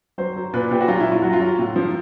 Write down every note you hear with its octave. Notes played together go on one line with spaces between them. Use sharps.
F#3 C5
F#3
A#2 B4
A#2 G4
F#4
F#3 F4
E4
F#3
F4
F#3 F#4
F4
F#3
A2
F3